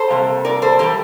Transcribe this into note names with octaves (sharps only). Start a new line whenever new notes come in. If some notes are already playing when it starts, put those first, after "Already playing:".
Already playing: A4 C5
C3 G3 A#3
A#4 D5
A4 C5
E3 G3 G4 A#4